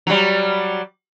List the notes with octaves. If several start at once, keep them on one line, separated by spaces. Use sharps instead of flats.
F#3 G3